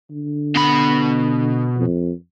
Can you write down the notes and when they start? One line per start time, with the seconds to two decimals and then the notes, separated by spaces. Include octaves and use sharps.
0.11 D3
0.55 B2 B5
1.77 F2